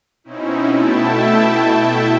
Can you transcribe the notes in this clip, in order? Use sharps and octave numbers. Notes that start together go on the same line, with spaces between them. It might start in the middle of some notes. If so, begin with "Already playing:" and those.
B2 C4 C#4 D#4 E4
B2 A3 E4 E5 G5 A5